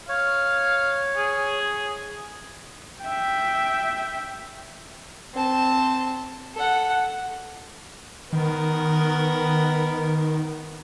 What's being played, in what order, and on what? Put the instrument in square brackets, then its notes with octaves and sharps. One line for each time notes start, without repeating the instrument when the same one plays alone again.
[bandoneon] C#5 [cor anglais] F5
[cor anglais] G#4
[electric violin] E5 G5
[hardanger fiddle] C4 A5
A4 F#5
[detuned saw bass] D#3 [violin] B3 A#4